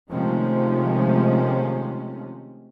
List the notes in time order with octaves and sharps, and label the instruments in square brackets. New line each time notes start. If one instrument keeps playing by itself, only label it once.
[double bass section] C3 D#3 F3 G#3 A3 C#4